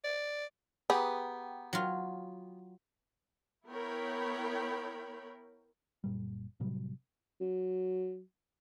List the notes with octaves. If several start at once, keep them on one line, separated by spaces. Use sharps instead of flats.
D5
B3 G4 G#4 F#5 G5 A#5
F#3 F4
B3 E4 A#4 C#5 G5 B5
F#1 A#2 G3
A2 C3 F#3 G3
F#3